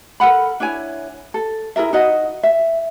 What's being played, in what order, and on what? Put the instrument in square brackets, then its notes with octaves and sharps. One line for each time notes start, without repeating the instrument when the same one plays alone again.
[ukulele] A4 A#4 F#5 B5
D4 E4 C#5 G#5
A4
E4 G#4 A#4 E5
D#4 F#4 D#5
E5